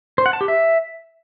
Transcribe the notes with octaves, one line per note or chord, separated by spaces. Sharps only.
C5
F#5
A5
G4
E5